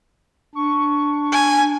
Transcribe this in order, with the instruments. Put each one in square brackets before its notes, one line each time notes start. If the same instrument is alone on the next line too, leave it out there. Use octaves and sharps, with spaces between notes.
[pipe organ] D4 [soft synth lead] C#6
[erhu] G#5